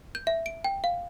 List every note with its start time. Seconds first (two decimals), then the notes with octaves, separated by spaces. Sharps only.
0.15 G6
0.27 E5
0.46 D7
0.64 G5
0.84 F5